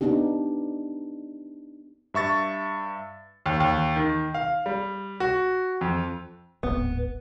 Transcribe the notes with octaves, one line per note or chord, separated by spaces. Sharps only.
B3 D4 D#4 G4
G2 E5 C#6 A6
D#2
D#2
D#3
F5
G3
F#4
F2
D1 G#1 B3